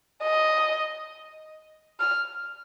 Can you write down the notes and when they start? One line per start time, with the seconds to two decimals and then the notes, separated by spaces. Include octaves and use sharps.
0.23 D#5
2.00 F6